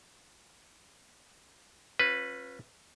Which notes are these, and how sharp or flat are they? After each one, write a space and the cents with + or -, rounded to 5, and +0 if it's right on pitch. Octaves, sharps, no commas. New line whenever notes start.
C#4 -40 F4 +25 B4 +0